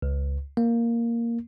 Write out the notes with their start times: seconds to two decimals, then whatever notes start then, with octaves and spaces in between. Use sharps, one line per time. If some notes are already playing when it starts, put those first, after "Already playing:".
0.02 C#2
0.57 A#3